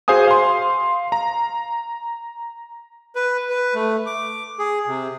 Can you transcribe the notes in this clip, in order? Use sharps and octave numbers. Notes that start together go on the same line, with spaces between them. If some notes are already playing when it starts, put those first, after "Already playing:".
F#4 G#4 C5 F5 G#5 D#6
F5 C6
A#5
B4
B4
A3
D6
G#4
C3